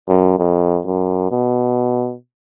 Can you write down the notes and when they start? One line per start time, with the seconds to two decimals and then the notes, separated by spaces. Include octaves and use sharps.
0.08 F#2
0.38 F2
0.86 F#2
1.31 B2